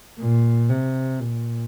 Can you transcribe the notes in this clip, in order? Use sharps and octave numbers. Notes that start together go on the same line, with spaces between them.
A#2
C3
A#2